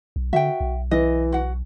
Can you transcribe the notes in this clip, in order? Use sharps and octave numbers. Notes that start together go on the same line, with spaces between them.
B1
D3 F#4 E5 G5
B1
E3 D#5
F#4 F#5